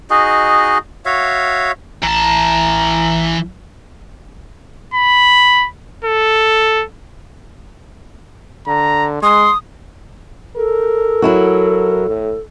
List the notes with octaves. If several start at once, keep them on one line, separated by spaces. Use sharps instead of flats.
D#4 F#4 G#4 D#5
F#4 C#5 E5 F5
A1 E3 A5 A#5
B5
A4
D3 A#5
G#3 C6 D#6
A4 A#4
F#3 E4 F#4
A2